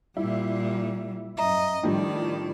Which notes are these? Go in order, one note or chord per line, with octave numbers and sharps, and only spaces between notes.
A#2 G3 E4
F#2 D#5 E5 A#5
A2 D#3 F3 G3 D4 D5